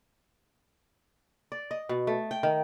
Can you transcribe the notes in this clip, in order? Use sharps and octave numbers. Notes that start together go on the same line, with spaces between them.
D5
D#5
B2
A3
G5
D#3